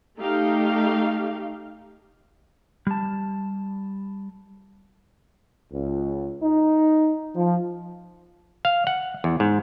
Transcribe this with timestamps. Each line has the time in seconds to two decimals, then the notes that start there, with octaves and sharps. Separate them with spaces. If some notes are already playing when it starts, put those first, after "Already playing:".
0.19 A3 D#4 G4 F5
2.87 G3 A5
5.71 C#2
6.42 D#4
7.35 F3
8.65 F5
8.87 F#5
9.24 E2
9.40 G#2